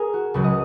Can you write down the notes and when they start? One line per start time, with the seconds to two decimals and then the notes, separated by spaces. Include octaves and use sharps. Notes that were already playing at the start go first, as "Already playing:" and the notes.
Already playing: A#3 G#4 A#4
0.13 F#4
0.34 C#2 C#3 F#3
0.44 D#5